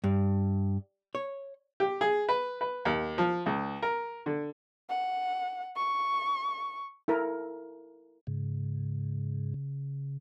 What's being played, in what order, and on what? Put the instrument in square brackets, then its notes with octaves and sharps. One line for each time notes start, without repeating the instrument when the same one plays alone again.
[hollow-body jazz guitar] G2
C#5
[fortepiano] G4
G#4
B4
B4
D#2
F3
C#2
A#4
D3
[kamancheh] F#5
C#6
[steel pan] E4 A4 A#4
[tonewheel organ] G#2 [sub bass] C#3